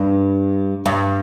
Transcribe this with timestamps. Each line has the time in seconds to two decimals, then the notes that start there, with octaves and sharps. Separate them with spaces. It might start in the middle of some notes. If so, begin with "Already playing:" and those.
Already playing: G2
0.86 G2